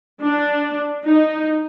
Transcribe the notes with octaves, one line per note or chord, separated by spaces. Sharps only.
D4
D#4